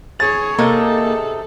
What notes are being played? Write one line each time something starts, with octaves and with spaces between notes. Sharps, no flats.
G#4 C#5 A6
C3 A#3 D#4 G#4 A4